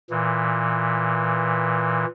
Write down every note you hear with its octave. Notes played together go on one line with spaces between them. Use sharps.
A#2 E3